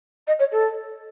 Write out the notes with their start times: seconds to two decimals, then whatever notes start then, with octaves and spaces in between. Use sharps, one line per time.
0.27 D#5
0.39 C#5
0.51 A4